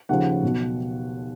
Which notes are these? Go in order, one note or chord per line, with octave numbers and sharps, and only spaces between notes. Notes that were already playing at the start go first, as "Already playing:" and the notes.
D#2 C#3 F3 F#5
B1 B2